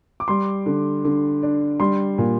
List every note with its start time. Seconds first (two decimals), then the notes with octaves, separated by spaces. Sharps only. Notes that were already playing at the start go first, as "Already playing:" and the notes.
0.20 D6
0.28 G3 C6
0.66 D3
1.05 D3
1.43 D4
1.80 G3 C6
2.18 A#2